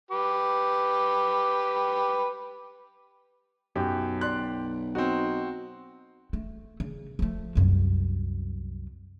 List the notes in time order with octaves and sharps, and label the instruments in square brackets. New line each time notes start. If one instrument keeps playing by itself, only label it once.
[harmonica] G4 B4
[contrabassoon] B1 [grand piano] F#2 [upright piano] G4
[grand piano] D5 C6 F#6
[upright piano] C4 F#4 [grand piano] D#4
[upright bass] A3
C#3
F3 A3
C2 F#2